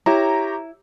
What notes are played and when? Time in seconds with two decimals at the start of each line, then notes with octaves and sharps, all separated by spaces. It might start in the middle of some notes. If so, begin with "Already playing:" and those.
0.06 E4 G4 C#5 A#5